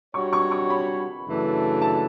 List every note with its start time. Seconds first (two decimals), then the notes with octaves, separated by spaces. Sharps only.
0.14 G3 D4 F#4 C#5 C#6
0.33 C#6
0.51 C#6
0.70 B5
1.26 F#2 C#3 E3 A3 D4
1.82 A5